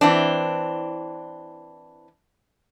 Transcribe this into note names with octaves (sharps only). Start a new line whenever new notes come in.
E3 C4 D4